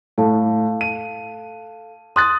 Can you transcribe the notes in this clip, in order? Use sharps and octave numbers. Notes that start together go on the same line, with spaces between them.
A2 A4 F5 A5
D#7
C6 D#6 F#6 A6